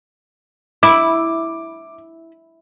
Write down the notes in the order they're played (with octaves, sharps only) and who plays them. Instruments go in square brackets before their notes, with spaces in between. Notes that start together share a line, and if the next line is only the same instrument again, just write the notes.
[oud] E4 [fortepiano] D6